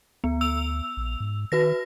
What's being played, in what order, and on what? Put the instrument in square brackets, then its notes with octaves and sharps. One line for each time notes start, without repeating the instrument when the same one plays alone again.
[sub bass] D2 [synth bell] B3
[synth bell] E6 F7
[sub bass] A#1
G#2
[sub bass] D#3 [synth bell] F#4 B4 A#6